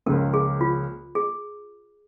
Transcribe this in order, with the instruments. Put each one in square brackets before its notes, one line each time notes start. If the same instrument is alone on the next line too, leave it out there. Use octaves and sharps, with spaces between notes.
[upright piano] C#2 C#3 F3 A#3 [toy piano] A#4
[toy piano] G#4
F4
G#4